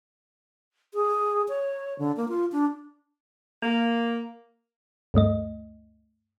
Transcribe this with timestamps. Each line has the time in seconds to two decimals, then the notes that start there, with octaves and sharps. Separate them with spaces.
0.94 G#4
1.49 C#5
1.99 D3
2.17 A#3
2.29 F4
2.52 D4
3.63 A#3
5.14 D2 G2 A3 D#5